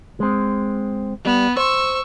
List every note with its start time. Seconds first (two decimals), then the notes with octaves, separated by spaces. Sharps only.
0.20 G#3 C4
1.25 G3 B3
1.57 C5 C#6 E6